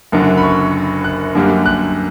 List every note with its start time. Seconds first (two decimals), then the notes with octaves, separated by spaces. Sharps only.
0.12 F#1 F#2 D3
0.37 B5
0.43 C#6
1.04 F#6
1.35 F#2 D3 G3 A#3
1.66 F#6